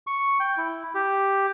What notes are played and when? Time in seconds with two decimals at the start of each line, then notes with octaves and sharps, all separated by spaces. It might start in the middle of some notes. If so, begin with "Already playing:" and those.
0.07 C#6
0.40 G5
0.58 E4
0.95 G4